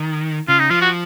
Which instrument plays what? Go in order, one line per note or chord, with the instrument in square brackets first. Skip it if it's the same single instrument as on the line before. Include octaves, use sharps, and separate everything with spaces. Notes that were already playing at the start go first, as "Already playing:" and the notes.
Already playing: [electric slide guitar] D#3
[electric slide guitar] C#3 [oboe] F4
[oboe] D#4
[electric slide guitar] F3 [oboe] F4
[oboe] F#4